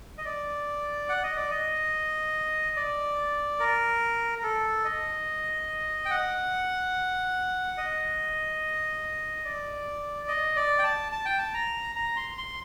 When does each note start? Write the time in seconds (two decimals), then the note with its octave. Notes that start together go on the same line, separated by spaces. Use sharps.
0.18 D#5
0.25 D5
1.09 F#5
1.23 D#5
1.37 D5
1.51 D#5
2.76 D5
3.59 A#4
4.39 A#4
4.43 A4
4.84 D#5
6.05 G5
6.11 F#5
7.78 D#5
9.45 D5
10.28 D#5
10.56 D5
10.79 G5
10.84 A5
11.12 A5
11.25 G5
11.39 A5
11.54 A#5
11.95 A#5
12.16 C6
12.38 C6